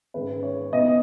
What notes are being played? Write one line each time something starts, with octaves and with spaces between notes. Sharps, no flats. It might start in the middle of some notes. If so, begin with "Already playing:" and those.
G#2 D#3 G#3 C#4 B4
C#5
B2 B3 D#4 D#5